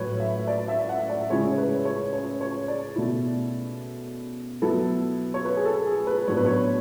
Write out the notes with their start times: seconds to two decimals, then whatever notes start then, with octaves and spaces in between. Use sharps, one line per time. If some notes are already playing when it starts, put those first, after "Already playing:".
Already playing: A2 F#3 B4 C#5
0.20 E5
0.47 D5
0.68 E5
0.89 F#5
1.10 D5
1.30 C#3 G#3 C#4 E4 C#5
1.52 C#5
1.58 B4
1.85 C#5
2.13 C#5
2.41 C#5
2.68 D5
2.96 B2 A3 E4
4.62 F#3 B3 E4 A4
5.34 C#5
5.45 B4
5.57 G#4
5.65 A4
5.87 G#4
6.07 B4
6.28 A2 F#3 B3 D4 C#5
6.37 B4
6.46 C#5